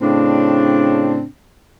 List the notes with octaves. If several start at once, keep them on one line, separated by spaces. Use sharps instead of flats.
A2 C#3 C4 D4